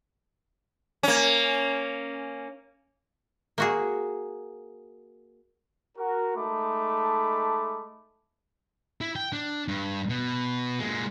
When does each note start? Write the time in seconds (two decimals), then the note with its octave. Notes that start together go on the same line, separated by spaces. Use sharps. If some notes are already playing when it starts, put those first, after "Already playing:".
1.03 A#3 C#4
3.58 A#3 F#4 G#4
5.97 F#4 A#4
6.36 G#3 A3 D#4 A5 B5 D6
9.01 E4
9.16 G5
9.33 D4
9.68 G2
10.09 B2
10.79 A#2 G#3